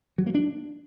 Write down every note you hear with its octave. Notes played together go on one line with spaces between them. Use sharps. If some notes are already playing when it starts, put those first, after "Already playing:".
F#3
A#3
D4